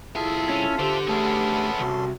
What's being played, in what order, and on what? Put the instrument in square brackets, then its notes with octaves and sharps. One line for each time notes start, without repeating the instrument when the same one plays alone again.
[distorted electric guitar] C2 G#4 [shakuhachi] E4 [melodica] F4 A4 E5
[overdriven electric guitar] C#4
[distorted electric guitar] D3 [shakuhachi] G4 [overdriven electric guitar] C5
[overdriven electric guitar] D3 A3 [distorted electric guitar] B3 G#4 [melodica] C#4 A4 C6
[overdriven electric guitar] C2 [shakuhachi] F#4